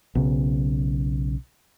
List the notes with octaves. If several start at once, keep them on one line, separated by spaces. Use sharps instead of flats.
B1 C#3